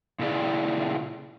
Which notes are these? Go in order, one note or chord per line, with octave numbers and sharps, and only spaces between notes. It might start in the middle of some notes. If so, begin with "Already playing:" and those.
A#2 C#3 E4 G#4 D5